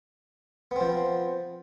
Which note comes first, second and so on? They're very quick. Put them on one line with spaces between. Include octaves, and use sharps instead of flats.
B3 C4 F3